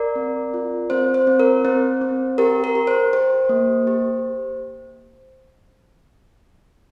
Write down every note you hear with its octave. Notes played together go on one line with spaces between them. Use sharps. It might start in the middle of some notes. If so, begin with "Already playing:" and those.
Already playing: A#4 D5
C4
F4
C4 C5
C5
C4
A#4
C4 C5
C4
G4 A#4
A#4
G4
C5
G4 C5
A#3
G4